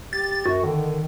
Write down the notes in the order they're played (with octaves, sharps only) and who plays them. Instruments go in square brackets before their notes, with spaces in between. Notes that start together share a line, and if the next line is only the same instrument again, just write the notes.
[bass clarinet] G4 [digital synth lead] A6
[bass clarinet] F#2 [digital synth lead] F#4
[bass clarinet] D3 [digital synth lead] D#3